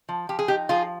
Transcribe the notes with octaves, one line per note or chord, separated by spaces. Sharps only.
F3
F3 G4
G#4
D#4 G4
F3 F4 G#4